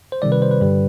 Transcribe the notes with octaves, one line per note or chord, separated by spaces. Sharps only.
C5
C3 D#3 G3 D5
B4
C5
B4
G2 D3 G3